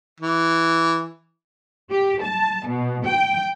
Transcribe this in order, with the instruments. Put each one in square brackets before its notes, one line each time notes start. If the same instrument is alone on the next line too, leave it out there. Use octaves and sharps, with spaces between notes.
[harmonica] E3
[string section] G4
A5
B2
G5